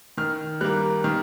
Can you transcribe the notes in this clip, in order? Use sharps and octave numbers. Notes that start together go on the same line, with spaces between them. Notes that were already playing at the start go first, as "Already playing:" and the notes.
D#3 F6
G3 A#3 F#6
D#3 F6